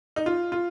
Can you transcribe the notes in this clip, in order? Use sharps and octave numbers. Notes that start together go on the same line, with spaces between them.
D#4
F4
F4